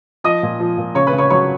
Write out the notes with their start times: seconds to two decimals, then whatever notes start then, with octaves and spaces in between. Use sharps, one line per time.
0.24 F3 D#5 D#6
0.43 A#2
0.60 F3
0.78 A#2
0.95 C#3 C#5 C#6
1.07 B4 B5
1.13 C#3
1.18 C#5 C#6
1.30 F#3 C#5 C#6